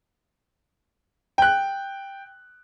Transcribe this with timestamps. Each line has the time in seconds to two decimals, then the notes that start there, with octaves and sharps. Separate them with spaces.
1.38 G5 F#6